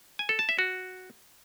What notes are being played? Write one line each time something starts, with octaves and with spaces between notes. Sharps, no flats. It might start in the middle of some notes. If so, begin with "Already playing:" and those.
G#5
A4
A5
E5
F#4